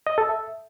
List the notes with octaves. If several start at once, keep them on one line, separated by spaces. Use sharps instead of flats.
D#5
A4
E5